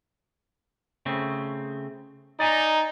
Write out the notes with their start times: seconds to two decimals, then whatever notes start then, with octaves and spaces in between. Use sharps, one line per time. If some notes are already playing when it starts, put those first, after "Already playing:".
1.06 C#3 A3 C4
2.40 D#4 D5 G#5 A#5